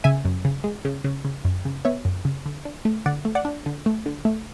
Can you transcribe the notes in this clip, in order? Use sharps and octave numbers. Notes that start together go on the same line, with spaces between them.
C#3 E5 G#5
F#2
C#3
G#3
C#3
C#3
C#3
F#2
C#3
B3 C#5 E5
F#2
C#3
D3
D4
A3
D3 D5 F#5
A3
D5 F#5
D4
D3
A3
D3
A3